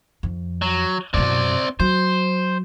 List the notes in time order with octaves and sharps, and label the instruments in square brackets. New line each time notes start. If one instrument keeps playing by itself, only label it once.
[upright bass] F2
[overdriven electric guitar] F#3
[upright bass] F#2 B2 [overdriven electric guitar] C4 D5
[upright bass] F#3 [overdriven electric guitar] C5